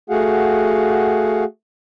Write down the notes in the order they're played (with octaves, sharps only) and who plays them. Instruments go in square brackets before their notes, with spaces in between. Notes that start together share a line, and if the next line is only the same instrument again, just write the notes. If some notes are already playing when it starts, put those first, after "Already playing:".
[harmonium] A3 F#4 G#4 F5 F#5